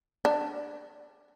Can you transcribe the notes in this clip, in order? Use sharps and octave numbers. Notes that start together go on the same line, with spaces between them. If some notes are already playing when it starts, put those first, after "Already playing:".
D4